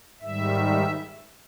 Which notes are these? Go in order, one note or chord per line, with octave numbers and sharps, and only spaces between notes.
G#2 D#3 G3 E5